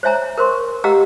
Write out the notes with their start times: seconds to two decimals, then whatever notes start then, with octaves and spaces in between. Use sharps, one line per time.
0.03 C5 C#5 E5 G#5 A#5
0.38 A#4 C5 C6 C#6
0.84 G4 D#5 F5 F#5 A#5 E6